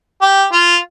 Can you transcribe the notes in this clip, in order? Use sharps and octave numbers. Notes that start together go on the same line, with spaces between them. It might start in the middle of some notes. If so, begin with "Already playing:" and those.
G4
F4